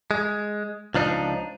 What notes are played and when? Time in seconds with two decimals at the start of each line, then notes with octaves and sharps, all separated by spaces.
0.11 G#3
0.95 C#2 F3 D4 D#4